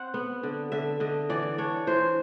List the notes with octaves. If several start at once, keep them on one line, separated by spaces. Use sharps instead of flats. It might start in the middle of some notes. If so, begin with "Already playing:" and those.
Already playing: C4 F#5
B3
D3
D3 E5
D3 D#5
E3 D5
D4 C#5
E3 C5